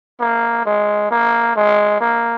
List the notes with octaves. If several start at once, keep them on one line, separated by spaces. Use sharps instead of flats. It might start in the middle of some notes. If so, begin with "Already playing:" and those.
A#3
G#3
A#3
G#3
A#3